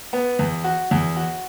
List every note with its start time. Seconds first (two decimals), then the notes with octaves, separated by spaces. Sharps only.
0.13 B3
0.39 E2
0.64 F#4
0.91 E2
1.16 F#4